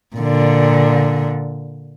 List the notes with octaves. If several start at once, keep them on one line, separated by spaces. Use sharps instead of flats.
A#2 D3